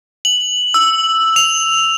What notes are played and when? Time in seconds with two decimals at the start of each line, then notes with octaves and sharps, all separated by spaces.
0.25 F#7
0.74 E6
1.36 F7